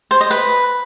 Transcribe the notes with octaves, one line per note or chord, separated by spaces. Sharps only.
C5
D#5
B4